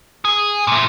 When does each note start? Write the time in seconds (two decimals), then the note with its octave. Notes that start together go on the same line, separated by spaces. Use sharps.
0.25 G#4
0.67 A#2 A3